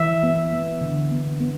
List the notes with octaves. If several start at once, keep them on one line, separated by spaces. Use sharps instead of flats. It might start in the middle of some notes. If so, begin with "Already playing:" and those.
Already playing: E3 E5
B3
B3
D3
B3
B3